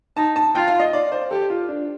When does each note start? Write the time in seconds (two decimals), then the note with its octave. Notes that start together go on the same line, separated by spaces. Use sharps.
0.17 D#4 A5
0.36 A5
0.55 F4 G5
0.68 F5
0.80 D#5
0.93 D5
1.12 C5
1.31 G4 A4
1.50 F4
1.68 D4